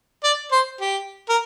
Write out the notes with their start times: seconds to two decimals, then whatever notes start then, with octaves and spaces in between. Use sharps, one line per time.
0.24 D5
0.52 C5
0.80 G4
1.29 A#4